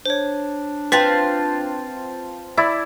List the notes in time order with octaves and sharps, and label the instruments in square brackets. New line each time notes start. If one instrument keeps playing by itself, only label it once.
[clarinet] D4 [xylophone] C5 C#5
[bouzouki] C4 F4 C5 [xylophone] B4 B6 [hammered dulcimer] A5
[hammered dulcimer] E4 D5